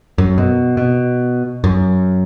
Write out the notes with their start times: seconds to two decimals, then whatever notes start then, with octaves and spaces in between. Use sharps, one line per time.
0.18 F#2
0.38 B2
0.77 B2
1.64 F#2